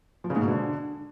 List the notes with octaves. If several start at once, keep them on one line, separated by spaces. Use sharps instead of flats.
F3
C#3
G#2
B2
D3